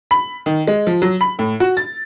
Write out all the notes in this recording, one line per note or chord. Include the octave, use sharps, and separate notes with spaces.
B5
D#3
G#3
F3
F#3
B5
A2
F#4
A6